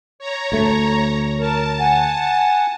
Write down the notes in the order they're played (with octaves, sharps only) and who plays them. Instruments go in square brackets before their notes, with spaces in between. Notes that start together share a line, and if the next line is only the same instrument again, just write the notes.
[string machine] C#5 A#5
[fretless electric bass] D2 A3
[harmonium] A#4 [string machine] A5
[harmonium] F#5 G#5